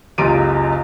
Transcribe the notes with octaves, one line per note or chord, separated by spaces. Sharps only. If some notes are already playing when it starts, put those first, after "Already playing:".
F#1 C#2 F4 G4 D7 D#7